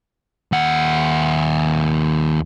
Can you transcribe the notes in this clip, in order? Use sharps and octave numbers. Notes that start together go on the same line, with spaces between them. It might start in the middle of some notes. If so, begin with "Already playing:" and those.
D#2 F#5